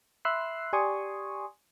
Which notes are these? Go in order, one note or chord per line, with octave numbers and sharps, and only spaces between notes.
E5 B5 C6 E6 F#6 C7
G4 D5 G#5 C6 C#6 D#6